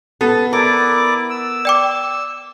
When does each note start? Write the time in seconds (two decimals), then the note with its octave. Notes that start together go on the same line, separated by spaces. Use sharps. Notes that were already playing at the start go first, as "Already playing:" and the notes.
0.21 B3 A4
0.53 E4 A#4 D5 D6
1.30 E6
1.65 D5 G5 D6